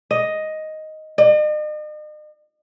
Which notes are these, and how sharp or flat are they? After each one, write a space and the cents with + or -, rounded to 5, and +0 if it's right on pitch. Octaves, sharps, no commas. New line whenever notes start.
D#5 +5
D#5 -45